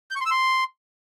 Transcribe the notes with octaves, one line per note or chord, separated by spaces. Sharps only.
G6
C#6
C6
E6
C6